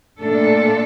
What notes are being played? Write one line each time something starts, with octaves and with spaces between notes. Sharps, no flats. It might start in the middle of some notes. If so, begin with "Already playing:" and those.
A#2 A3 D4 A4